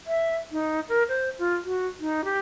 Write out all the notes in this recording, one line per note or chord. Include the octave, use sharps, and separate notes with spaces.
E5
D#4
A#4
C5
F4
F#4
D#4
G4